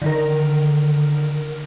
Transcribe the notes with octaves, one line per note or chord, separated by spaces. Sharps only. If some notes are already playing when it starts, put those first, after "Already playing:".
D3 D#3 A#4